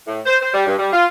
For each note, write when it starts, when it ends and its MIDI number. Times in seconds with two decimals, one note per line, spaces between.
0.07 0.20 45
0.26 0.35 72
0.40 0.50 72
0.54 0.64 55
0.66 0.74 43
0.78 0.92 55
0.92 1.05 65